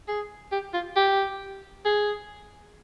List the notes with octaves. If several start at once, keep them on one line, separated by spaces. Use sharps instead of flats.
G#4
G4
F4
G4
G#4